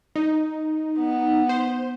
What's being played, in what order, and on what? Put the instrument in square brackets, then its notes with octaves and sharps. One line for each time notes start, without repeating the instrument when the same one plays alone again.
[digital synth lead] D#4
[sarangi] B3
[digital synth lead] C5